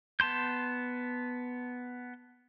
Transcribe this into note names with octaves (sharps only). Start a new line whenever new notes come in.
B3 A5 C6 G6